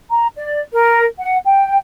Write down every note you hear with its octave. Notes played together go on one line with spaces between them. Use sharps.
A#5
D5
A#4
F#5
G5